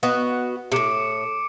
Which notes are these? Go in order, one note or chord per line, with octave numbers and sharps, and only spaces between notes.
B3 F#4 D#5
A2 C3 D6 C#7 D7